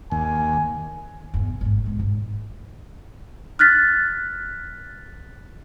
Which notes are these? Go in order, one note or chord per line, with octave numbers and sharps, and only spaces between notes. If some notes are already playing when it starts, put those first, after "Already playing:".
D#2 G#5
E2 G2
A#2
G#1 G2
A#1 G#3
G#2 D#4
F6 F#6 A6 B6